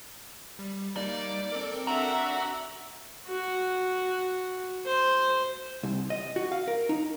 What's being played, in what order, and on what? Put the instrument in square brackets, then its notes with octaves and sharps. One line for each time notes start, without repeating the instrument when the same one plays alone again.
[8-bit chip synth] G3
[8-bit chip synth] G3 A#3 D#4 [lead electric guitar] D5
[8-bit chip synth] C4 A4 A#4
[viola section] D4 E5 [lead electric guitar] F#4 [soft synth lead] A#5
[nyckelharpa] F#4
C5
[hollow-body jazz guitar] C2
D#5
F#4
F5
A#4
D#4